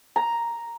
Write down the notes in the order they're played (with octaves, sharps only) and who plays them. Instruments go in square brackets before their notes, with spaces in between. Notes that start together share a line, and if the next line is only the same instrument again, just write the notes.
[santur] A#5